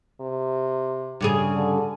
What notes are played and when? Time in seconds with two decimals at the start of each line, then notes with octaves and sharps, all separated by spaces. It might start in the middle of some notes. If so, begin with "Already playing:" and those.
0.21 C3
1.21 G2 C#3 G#4
1.55 D3